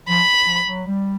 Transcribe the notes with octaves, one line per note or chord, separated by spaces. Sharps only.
F3 B5
F3
F#3
G3